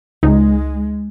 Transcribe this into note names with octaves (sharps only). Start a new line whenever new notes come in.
C#2 G#3 D#4